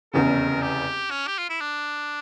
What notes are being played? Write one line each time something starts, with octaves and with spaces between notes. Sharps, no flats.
F1 E2 C#3 A#4
G4
C#4
G4
F4
E4
D4